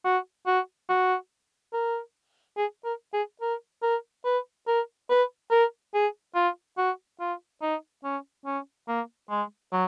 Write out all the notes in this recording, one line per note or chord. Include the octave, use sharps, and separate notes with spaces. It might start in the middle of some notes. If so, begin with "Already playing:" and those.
F#4
F#4
F#4
A#4
G#4
A#4
G#4
A#4
A#4
B4
A#4
B4
A#4
G#4
F4
F#4
F4
D#4
C#4
C#4
A#3
G#3
F#3